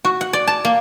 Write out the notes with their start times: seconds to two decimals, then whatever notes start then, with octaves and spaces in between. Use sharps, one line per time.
0.05 F#4
0.21 F#5
0.33 D5
0.48 A5
0.65 A#3